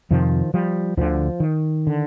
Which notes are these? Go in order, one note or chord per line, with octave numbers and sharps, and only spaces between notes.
F2 C3 D#3 F3
F3 G3
D2 D3 D#3 F3
D#3
D3